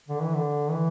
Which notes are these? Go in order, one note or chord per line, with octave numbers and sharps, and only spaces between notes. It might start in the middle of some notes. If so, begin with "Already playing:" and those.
D3
E3
D3
E3